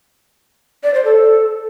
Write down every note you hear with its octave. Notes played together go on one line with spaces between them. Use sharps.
D5
C5
A4